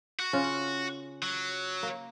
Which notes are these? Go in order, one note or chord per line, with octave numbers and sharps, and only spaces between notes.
F#4
C#3 C#4 F4
F#3
A#3